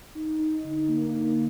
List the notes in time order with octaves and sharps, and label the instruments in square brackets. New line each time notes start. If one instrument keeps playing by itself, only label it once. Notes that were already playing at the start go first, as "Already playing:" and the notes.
[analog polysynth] D#4
D#4
D3
A#3
A#3